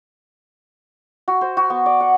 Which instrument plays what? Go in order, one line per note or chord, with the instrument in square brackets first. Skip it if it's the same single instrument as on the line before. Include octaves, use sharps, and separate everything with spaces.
[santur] F#4
C5
F#4
B3
D5
F#5